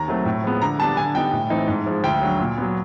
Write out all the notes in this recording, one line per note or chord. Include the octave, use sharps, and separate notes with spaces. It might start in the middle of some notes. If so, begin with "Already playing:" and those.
Already playing: D#2 A#5
D#3 F#3 A3 C4
A2
F3 G#3 B3
D3 A#5
G3 B3 D4 A5
D3 G#5
G3 B3 D#4 G5
A2
E3 A3 C4 D#4
G#2
F3 G#3
D2 G5
D3 F#3
A#2
F#3 B3